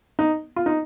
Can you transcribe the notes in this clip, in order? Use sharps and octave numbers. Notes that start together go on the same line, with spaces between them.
D#4
F4
D#4